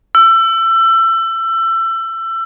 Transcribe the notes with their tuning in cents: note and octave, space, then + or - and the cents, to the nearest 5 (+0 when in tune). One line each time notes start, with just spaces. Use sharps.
E6 +25